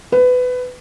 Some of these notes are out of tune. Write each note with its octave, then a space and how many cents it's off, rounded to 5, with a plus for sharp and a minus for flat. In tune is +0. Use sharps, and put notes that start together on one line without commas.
B4 +20